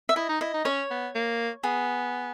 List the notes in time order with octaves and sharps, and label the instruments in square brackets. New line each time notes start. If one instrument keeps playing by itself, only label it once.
[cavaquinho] E5
[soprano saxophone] E4 [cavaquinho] D#5
[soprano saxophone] D#4
[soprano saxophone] E4 [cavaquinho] D#5
[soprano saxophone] D#4
[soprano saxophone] C#4 [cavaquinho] C#5
[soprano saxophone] B3
A#3
[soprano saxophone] B3 [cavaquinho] G#4